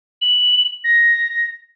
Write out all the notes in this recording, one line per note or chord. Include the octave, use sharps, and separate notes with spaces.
F#7
A#6